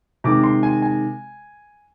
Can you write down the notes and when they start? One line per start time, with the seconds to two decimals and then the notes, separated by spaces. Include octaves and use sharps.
0.24 C3 D#3 G#3 D6
0.43 C6
0.63 G#5
0.82 G#5